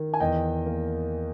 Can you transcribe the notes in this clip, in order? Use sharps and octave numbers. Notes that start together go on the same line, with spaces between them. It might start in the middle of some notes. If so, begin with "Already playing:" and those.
Already playing: D#3
G#5
E2 D#5 G5
A#3